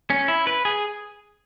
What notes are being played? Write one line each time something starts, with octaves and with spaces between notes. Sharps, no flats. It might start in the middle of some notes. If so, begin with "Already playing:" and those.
C#4
E4
B4
G#4